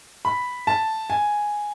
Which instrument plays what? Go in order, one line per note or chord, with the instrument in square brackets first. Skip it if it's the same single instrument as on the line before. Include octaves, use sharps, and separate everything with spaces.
[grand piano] B5
A5
G#5